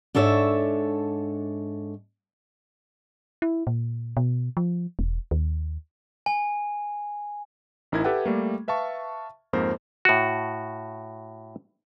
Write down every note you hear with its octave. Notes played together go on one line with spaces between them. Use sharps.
G#2 D4 A4 C#5 E5
E4
A#2
B2
F3
E1
D#2
G#5
A1 D#4 E4 A#4 G#6
G4 A4 B4 E5 F#5 G5
G3 A3 A#3
B4 E5 F5 A5 C#6
F2 G#2 F3 A#3 A#4 C5
A2 F#4